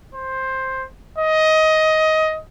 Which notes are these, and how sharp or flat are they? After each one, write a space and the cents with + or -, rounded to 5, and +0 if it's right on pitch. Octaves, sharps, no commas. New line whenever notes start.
C5 +10
D#5 +15